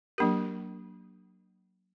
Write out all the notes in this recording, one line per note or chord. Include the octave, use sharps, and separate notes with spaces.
F#3 A#3 D4 G4 A#4